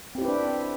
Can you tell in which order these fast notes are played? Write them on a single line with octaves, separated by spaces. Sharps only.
C4 G4 E4 B4 D4